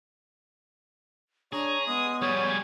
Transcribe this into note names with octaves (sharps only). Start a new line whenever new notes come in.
D4 G#4 C#5 A#5
G#3 B3 D#6
G3 G#4 C#5 G#6